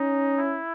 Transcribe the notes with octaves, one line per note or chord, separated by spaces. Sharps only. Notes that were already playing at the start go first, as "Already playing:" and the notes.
Already playing: C#4 D#4
E4